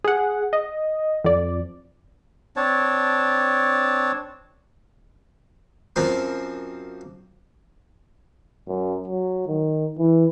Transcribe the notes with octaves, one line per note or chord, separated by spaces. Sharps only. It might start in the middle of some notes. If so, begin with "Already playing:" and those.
G#4 F#5
D#5
F2 D5
C4 D4 C#5 A5
F#2 F3 A#3 C4
F#2
F#3
D#3
E3